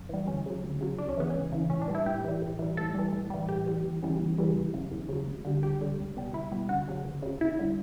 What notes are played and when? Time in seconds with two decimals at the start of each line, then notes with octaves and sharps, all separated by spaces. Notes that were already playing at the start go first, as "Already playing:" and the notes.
Already playing: F#2
0.09 E3 G3
0.27 D2 C#4
0.46 C#3 F#3
0.63 D2
0.81 C#3 F#3
0.98 C#2 D4
1.09 C#4
1.17 C#3 E3 B3
1.30 C#4
1.35 C#2
1.52 C#3 E3
1.70 A2 C#4
1.82 D4
1.88 E3 G3
1.95 E4
2.06 A2 G4
2.24 E3 G3
2.42 A2
2.59 E3 G3
2.77 A2 A4
2.95 E3 G3
3.13 A2
3.30 E3 G3
3.49 A2 G4
3.66 E3 G3
3.84 E2
4.03 C#3 E3 G3
4.20 E2
4.38 C#3 E3 G3
4.56 E2
4.74 C#3 F#3
4.91 E2
5.09 C#3 F#3
5.27 D2
5.44 D3 G3
5.62 D2 G4
5.81 D3 G3
5.98 C#2
6.17 B2 G3
6.33 C#2 E4
6.52 B2 G3
6.69 D2 F#4
6.88 C#3 F#3
7.05 D2
7.23 C#3 F#3
7.41 E2 E4
7.59 D3 G3